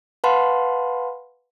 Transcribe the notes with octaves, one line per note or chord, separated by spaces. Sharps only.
B4 F5 F#5 A5 B5 C6